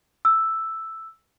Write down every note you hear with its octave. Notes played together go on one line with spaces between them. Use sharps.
E6